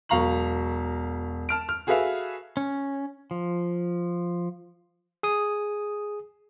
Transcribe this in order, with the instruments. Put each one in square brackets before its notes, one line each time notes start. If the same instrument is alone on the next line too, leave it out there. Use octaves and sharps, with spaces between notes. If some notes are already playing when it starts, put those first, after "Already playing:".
[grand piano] E1 F#3 F5 A#5 C#6 F#7
A5 F6 D7
F6
F#4 G#4 A4 B4 E5 F5
[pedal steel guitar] C#4
F3
[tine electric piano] G#4 D#6